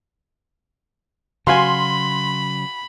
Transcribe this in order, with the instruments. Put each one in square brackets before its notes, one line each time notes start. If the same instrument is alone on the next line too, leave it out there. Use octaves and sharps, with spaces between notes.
[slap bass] C#3 F#3 [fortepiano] F#4 F5 G#5 [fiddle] B5 [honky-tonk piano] C6